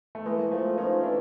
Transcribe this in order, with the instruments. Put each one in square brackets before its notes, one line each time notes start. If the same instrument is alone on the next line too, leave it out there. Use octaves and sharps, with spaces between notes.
[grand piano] A3
[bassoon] E3 [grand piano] G#3 A#3
[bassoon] F3 [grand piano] A3 B3
[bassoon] F3 [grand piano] C#4 D#4
[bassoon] E3 [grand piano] D4 E4